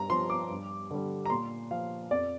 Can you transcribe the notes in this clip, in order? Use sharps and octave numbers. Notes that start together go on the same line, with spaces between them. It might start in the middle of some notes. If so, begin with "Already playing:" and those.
Already playing: G2 A#5
F3 C6
D6
G2
D3 G3
A#5
A#2 C6
F3 F5
F2 D5